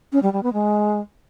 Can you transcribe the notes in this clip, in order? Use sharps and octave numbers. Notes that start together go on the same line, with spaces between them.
C#4
G3
G3
B3
G#3